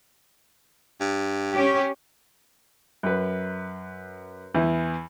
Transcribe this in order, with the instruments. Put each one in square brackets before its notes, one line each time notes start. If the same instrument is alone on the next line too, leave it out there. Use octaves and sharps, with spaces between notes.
[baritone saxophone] G2
[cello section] C#4 G4
[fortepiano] F#2 B4
E2 E3